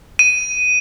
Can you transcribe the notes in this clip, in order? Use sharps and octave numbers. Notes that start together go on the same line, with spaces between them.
D#7